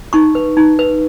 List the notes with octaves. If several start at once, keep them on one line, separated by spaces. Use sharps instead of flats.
D#4 C#6
B4
D#4
B4